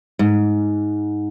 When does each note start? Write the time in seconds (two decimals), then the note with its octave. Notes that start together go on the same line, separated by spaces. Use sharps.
0.19 G#2